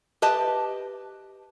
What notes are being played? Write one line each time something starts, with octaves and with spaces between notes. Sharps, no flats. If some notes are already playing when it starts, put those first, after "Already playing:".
G4 B4 D#5 A5